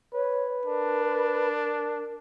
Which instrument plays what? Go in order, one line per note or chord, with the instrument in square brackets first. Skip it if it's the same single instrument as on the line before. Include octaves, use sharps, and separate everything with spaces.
[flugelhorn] B4 [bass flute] C#5
[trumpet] D4 [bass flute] A#4